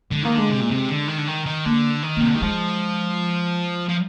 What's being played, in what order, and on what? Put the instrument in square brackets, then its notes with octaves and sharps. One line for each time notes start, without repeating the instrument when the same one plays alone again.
[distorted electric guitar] D3 [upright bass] G#3
[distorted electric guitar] D#3 [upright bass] A#3
[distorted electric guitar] D3 [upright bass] G#3
[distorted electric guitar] C3
A#2
C3
D3
D#3
D3
D#3
D#3
[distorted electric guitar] D3 [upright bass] A#3
[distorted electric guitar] D#3
[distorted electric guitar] C3 [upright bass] A#3
[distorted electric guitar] D3
[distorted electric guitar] D#3 [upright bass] G3
[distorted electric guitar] F3 [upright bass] G#3
[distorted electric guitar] F3